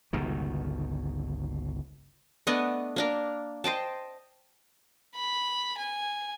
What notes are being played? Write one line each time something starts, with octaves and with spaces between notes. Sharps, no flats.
G1 C#2 B2 D#3
A3 B3 D4 D#5
A#3 D4 A#4
C5 D#5 G5 A5
B5
G#5